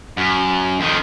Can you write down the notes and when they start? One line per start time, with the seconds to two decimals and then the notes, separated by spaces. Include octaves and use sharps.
0.17 F#2
0.80 F2 D#3